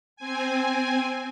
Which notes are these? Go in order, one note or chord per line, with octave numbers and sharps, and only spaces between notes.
C4 G#5